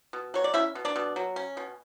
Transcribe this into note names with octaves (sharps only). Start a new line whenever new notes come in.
B2
F#3 C#5
D5
C#4 E4 E5
B2
D4 D5
B2
F#3
C#4
B2